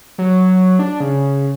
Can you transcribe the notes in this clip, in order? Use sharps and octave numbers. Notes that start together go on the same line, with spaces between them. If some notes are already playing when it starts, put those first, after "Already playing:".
F#3
D4
C#3